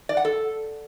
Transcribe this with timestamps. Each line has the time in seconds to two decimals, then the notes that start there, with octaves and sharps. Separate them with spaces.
0.09 D5
0.17 F#5
0.25 A4